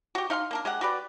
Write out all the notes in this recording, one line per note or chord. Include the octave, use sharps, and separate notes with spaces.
F#4 G4
D#4 F5 G5 C6
A#3 D4 A#4
G#3 G4 F#5
F#4 G4 B4 D5